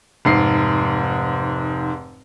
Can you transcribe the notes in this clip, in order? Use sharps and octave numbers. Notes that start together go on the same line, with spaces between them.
F1 G#2 C7